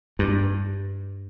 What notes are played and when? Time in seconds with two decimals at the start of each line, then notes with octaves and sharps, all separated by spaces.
0.19 G2